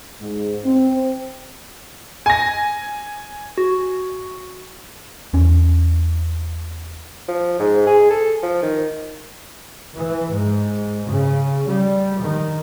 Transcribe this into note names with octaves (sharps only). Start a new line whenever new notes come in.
G#2
C4
G#5 A#6
F#4
E2 C#4
F3
G#2
G#4
A4
F3
D#3
E3
G#2
C#3
G3
D#3